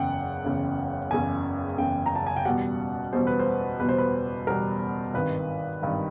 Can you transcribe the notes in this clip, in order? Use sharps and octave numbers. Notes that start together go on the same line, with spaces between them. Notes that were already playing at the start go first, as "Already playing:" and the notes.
Already playing: F#1 E2 C#3 F#5 G5
F#1 E2 C#3
F#1 E2 C#3 G#5
F#1 E2 C#3 G5
A#5
A5
G#5
G5
E2 B2 G3 F#5
E2 B2 G3 C5
B4
C5
E2 B2 G3 B4
C5
B4
E2 B2 G3 A#4
G#1 G2 D#3 B4
G#1 G2 D#3